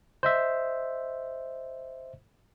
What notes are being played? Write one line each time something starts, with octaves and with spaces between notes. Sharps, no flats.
C5 D#5 E5